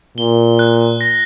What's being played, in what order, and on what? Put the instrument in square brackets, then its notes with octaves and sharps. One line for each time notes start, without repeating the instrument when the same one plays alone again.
[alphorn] A#2 [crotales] G7
[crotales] F#6
A#6